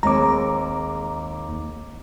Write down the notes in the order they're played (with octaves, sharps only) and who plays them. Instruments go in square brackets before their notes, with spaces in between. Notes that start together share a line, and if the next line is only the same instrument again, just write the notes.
[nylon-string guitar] D#2 [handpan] G#3 C4 [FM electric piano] A#5 D6